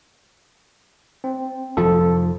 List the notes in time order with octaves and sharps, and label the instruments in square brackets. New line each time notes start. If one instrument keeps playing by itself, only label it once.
[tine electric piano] C4
[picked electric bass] F1 F2 F3 [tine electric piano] A4